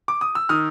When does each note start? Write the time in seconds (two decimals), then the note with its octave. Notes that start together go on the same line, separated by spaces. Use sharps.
0.08 D6
0.21 D#6
0.35 E6
0.49 D#3 D#6 F6